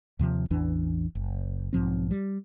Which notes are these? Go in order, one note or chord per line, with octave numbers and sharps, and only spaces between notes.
D#2 C3 F3
A1 E2 E3 D4
F#1
B1 G#2 F3 C4
G3